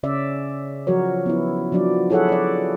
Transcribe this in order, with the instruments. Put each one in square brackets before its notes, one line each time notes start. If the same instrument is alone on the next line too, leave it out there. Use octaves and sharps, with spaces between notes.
[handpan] C#3 C#4 D5 E5
F3 F#3 F#4 A#4 C#5
B3 E4
F3 F#3 D4 D5
E4 G#4 A4 C#5 E5 F#5
C#5 D5